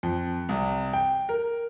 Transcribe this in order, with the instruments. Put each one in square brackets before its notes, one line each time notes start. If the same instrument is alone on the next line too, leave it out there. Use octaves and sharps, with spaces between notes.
[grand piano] F2
C2
G5
A#4